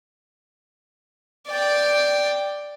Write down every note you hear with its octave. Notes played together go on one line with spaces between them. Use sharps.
D5 G5